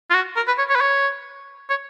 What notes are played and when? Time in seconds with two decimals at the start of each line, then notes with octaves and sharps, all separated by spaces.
0.10 F4
0.14 F#4
0.36 A#4
0.47 B4
0.58 C#5
0.69 C#5
0.75 B4
0.81 C#5
1.70 C#5